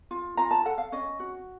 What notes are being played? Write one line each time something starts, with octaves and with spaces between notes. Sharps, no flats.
F4
F4 A#5
A5
A4 F#5
F5
C#4 D#5
F#4